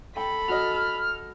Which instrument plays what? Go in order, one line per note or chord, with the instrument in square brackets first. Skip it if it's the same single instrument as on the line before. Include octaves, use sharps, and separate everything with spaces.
[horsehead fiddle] A4 [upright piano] G5 [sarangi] B5
[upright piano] F#4 D#5 [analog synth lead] F6